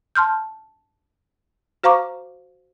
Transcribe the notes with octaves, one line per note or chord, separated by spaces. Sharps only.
A5 C6 F6 G6
F#4 C5 F5 A#5 C#6 D6